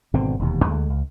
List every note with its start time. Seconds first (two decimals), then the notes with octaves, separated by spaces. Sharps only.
0.14 G#1 B2 D3 C4
0.39 E1 D#2 C3
0.64 D2 D3 G#3
0.90 C#2